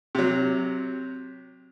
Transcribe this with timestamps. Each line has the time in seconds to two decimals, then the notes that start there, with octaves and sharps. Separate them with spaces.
0.15 C3 F#3